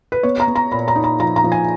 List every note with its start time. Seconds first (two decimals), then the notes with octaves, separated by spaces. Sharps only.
0.12 B4
0.23 B3 C#5
0.40 A#5
0.47 B3
0.56 A#5
0.71 A#2 B5
0.88 A#5
0.96 D#4
1.04 A#5
1.20 F3 A#5
1.36 A#5
1.44 F3
1.52 G#5